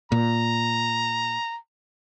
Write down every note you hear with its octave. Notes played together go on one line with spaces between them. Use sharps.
A#2 A#5